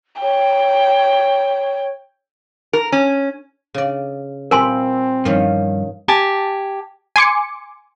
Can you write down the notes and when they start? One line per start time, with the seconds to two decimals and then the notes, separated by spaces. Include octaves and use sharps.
0.22 C#5 G5
2.73 A#4
2.92 C#4
3.74 C#3 D5
4.51 A#2 G3 C4 A#4 E5 G#5 C6
5.25 G2 D#3 F3 C#4
6.08 G4 G#5 A5
7.16 G#5 C6 D6 C#7